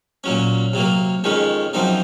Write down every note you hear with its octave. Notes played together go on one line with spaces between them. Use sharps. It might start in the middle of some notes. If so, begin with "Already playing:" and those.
A#2 F#3 C#4
C3 F#3 A#3
F2 D#3 G#3 C#4
F#2 F3 C4 D#4